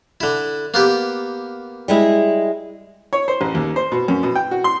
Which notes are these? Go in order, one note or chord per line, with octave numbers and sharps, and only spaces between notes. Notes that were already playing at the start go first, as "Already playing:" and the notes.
D3 E4
A#3 B3 G4
G3 G#3 E4
C#5
C5
A1
D#2
C5
B2
F#2
B2
G5
F#4
C6